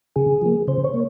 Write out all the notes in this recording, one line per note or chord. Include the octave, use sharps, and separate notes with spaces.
C#3 G#4
F3 A#3
C#3 C5
C#5
A#3